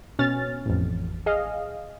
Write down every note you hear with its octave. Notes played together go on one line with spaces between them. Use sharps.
B2 C#4 F6 A6
A1 F2
G#4 D#5 F5